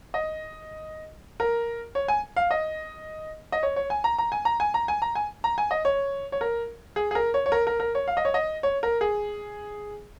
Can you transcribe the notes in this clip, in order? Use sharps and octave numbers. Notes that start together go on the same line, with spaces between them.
D#5
A#4
C#5
G#5
F5
D#5
D#5
C#5
C#5
G#5
A#5
A#5
G#5
A#5
G#5
A#5
G#5
A#5
G#5
A#5
G#5
D#5
C#5
C#5
A#4
G#4
G#4
A#4
C#5
C#5
A#4
A#4
A#4
C#5
F5
D#5
C#5
D#5
C#5
A#4
G#4